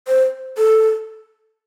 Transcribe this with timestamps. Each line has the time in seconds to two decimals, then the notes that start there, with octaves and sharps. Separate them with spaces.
0.08 C5
0.58 A4